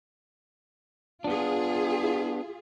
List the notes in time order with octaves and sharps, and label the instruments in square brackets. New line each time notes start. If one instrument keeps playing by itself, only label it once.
[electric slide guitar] B3 D4 [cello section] F4 G#4